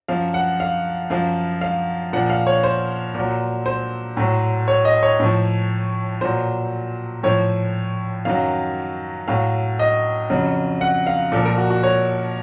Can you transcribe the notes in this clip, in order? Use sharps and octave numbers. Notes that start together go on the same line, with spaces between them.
F#2 F3 F5
F#5
F5
F#2 F3 F5
F5
A#2 F3 F#5
F5
C#5
C5
A#2 F#3
C5
A2 F#3
C#5
D#5
C#5
A2 F3
A#2 F#3 C5
A2 F3 C#5
F#2 D#3 F#3 F5
A2 F#3 F5
D#5
F2 C#3 F#3
F#5
F5
A#2 F3 A4
A#4
F#4
F#4
C#5